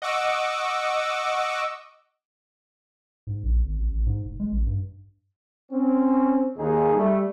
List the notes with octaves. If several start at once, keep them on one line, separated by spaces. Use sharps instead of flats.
D#5 F#5 C#6 D6 E6
G#2
A#1
G#1
A1
A1
G#2
F1
G#3
A1
G2
C4 C#4
D#2 D#4 G#4
G3 A3